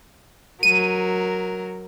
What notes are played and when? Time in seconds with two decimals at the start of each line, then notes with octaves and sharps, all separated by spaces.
0.63 F#3 A#4 D#7